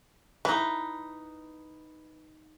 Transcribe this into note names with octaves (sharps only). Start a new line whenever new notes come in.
E3 D#4 B4